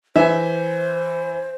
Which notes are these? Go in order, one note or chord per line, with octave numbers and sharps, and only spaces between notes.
E3 C5 E5 G#5